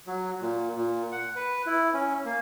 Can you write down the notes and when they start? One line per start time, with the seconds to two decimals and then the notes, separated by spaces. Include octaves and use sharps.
0.07 F#3
0.41 A#2
0.76 A#2
1.12 F#5
1.36 B4
1.67 E4
1.94 C#4
2.25 A#3